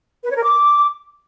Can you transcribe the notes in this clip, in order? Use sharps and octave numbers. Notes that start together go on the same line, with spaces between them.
B4
C#5
A#4
D6